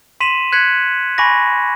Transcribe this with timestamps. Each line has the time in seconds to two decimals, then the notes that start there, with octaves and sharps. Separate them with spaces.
0.20 C6 B6 D#7 E7 F#7
0.52 F#6 G#6 B6 C#7 F#7
1.18 G#5 B5 C#6 D6 A#6